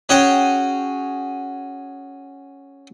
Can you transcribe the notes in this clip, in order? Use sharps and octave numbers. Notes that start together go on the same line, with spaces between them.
C#4 F#4 G#4 C#5 F#5 G5